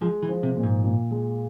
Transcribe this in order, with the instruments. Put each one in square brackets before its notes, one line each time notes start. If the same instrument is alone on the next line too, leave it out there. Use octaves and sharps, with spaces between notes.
[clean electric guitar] F3 [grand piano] G#3
[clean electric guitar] E3
[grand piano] F3
[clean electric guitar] C3
[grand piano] A#2
[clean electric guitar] G#2
[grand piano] A#2
G#3